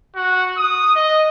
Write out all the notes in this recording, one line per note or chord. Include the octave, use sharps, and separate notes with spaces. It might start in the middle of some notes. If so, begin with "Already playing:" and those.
F#4
D#6
D#5